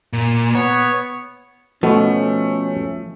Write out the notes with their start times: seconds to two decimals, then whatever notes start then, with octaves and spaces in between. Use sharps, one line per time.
0.13 A#2
0.55 B3 C#5
1.83 B2 F3 A3 C#4